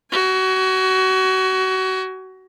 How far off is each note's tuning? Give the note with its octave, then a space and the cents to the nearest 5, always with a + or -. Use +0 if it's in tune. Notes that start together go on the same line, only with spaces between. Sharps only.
F#4 +25 G#5 +0